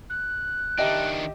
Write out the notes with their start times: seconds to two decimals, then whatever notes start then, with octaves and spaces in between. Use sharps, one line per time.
0.10 F#6
0.78 D#3 D4 G4 D#5 E5